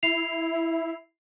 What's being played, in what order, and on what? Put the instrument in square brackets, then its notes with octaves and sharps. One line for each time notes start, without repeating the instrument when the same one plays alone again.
[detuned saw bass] E4 [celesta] C7 F7